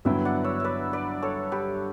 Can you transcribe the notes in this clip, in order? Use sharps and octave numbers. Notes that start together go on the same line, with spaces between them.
G2 D3 F#3 B3 E4 E5 G5
D5 F#5
C#5 E5
B4 D5 E5
B4 D5
A4 C#5
G4 B4